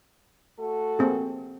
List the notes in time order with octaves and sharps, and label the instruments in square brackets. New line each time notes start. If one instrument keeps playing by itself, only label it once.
[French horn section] A3 F#4 A4
[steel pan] A#3 C4 G#4